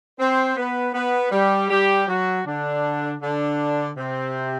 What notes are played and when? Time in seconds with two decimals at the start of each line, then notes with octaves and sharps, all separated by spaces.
0.19 C4 C5
0.56 B3 B4
0.94 B3 B4
1.32 G3 G4
1.69 G3 G4
2.07 F#3 F#4
2.46 D3 D4
3.22 D3 D4
3.97 C3 C4